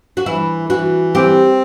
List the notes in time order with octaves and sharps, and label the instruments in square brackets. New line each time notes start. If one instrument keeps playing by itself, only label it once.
[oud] F#4
[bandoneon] E3 [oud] E4
[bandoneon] E3 [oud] F#4
[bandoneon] C4 [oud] G4